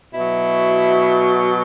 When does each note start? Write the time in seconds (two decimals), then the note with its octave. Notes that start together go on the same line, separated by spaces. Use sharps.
0.13 B2 F#3 E4